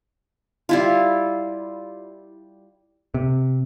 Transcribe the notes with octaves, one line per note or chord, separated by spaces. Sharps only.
G3 E4 F4
C3